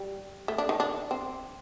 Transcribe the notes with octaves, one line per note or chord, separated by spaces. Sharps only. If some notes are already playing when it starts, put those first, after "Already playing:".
Already playing: G3
A3
D4
D#3
D4
C4